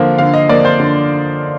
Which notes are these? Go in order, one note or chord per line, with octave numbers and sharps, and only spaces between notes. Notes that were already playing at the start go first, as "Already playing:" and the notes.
Already playing: D3 F3 A#3
D3 F5
D#5
F3 A#3 D5
C5
D3